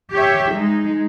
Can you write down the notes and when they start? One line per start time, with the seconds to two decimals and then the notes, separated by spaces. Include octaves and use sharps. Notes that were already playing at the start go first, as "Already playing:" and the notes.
0.14 G4 C#5 E5
0.54 G#3 D#4